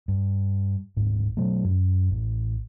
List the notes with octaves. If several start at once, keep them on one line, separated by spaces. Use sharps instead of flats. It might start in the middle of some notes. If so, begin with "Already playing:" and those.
G2
D1 G#1 G#2
B2 F#3 A3
F#2
A1